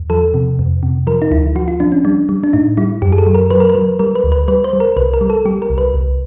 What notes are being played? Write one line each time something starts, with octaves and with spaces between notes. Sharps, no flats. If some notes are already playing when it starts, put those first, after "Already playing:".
Already playing: E2
F3 A4
C3
F2
C3
F3 A#4
D#4
D2 E4
F3 F#4
F4
F3 D4
C#4
G3 D4
G3
D4
A2 D#4
G3 E4
F#2 G4
G#4
A4
F#3
A#4
F#3 B4
A#4
B4
F#3
G3 A#4
B4
D2
B4
G3 B4
C5
G3
A#4
C2 B4
A#4
G3
A4
G3 G4
A#4
C2
B4
C2